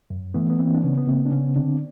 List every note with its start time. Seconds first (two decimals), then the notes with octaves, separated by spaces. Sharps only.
0.10 F#2
0.34 E3 A3 B3
0.50 B3
0.59 E3 A#3 C4
0.74 D4
0.83 C#3 B3 C#4
0.97 B3
1.07 C#3 A#3 C4
1.25 D4
1.31 C#3 B3 C#4
1.56 D3 C4 D4